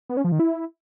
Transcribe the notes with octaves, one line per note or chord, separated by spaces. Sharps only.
B3
C#4
F3
D#3
E4